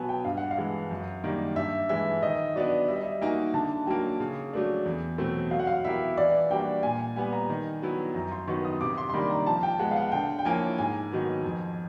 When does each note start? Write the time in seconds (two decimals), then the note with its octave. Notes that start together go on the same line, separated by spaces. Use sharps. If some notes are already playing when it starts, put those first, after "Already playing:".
Already playing: B2 F#3 B3 G#5 A5
0.09 G5
0.24 G2 F5
0.38 F#5
0.51 F5
0.57 E3 G#3
0.91 F#2
1.24 D#3 G3 A#3
1.56 G2 E5
1.89 E3 G#3 E5
2.22 D#3 D#5
2.56 F#3 B3 D4 D5
2.88 G3 E5
2.96 D#5
3.03 E5
3.21 A#3 D#4 F#4 G#5
3.54 D3 A5
3.86 F#3 A#3 G5
4.20 C#3
4.53 F#3 A3 D4
4.85 E2
5.18 B2 F#3 A3 C4
5.51 F#3 F5
5.59 F#5
5.67 F5
5.85 B3 E4 G4 A#4 E5
6.17 E3 D5
6.50 G3 A#3 D4 F#4 G5
6.83 A#2 G#5
7.16 G3 B3 G#5
7.32 A#5
7.50 D#3
7.82 F#3 B3 E4
8.15 F#2 A#5
8.31 C6
8.47 D#3 F#3 B3 C#6
8.65 D#6
8.81 C3 D6
8.98 C6
9.09 C6
9.13 D#3 G3 A#3 D4 B5
9.30 A#5
9.46 F3 A5
9.63 G5
9.79 G#3 B3 F#5
9.91 F5
9.96 F#5
10.12 D3 G5
10.39 G5
10.45 F3 A#3 C#4 E4 G#5
10.78 G#2 G#5
11.12 D#3 F#3 B3
11.44 F2